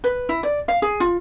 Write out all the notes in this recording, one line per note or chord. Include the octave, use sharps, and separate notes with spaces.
B4
E4
D5
F5
G#4
F4